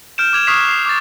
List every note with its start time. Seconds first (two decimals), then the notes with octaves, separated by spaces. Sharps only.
0.18 F6 G6 D7 E7
0.33 D6 G#6 F7
0.47 C#6 D#6 F6 F#6 B6 C7
0.68 C7
0.86 D6 A6